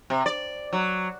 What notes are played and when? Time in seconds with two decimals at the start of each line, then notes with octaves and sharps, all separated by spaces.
0.10 C3
0.26 D5
0.73 F#3